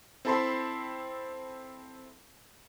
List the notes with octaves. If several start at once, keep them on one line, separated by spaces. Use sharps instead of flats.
C4 E4 A4 A5 B5 C6